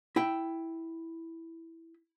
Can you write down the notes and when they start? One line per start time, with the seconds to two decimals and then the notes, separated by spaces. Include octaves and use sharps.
0.16 E4 G5